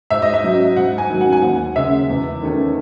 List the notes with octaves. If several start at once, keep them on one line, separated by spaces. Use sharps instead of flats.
G#2 E5
D#5
E5
F#3 C#4
G#2 F#5
G#5
D#3 F#3 C#4
F#5
G#5
D#2 F#5
C#3 G#3 C#4 E5
E2
D#3 A3 C#4